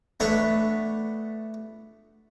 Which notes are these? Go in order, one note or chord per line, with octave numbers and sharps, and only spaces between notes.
A3 B3 D4 C#5 B5